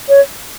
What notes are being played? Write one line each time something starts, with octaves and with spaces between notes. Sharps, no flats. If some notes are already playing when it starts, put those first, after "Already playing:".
C#5